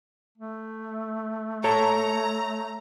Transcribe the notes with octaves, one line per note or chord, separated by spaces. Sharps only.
A3
A4 C#5 A5 A#5